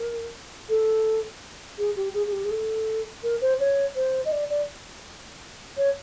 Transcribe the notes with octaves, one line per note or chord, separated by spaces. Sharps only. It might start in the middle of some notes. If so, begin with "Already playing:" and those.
Already playing: A#4
A4
G#4
G4
G#4
G#4
G4
G#4
A4
A#4
C5
C#5
C5
D#5
D5
D5
C#5